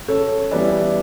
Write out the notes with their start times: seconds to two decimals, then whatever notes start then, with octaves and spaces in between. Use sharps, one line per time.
0.08 C#3 A4 C#5
0.51 E3 G3 B3 E4 B4 D5